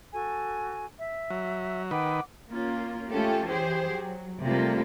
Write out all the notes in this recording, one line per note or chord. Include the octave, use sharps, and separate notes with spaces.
F#4 A4 G#5
E5
F#3
D#3 B4 F#5 G5 D6
A#3 C#4 F4
A3 C#4 F4 G4 A4
E3 G4 G#4 C5
F#3
C3 G3 A3 A#3 F4